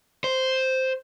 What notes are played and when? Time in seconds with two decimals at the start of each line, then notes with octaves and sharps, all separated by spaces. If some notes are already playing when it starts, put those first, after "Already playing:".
0.24 C5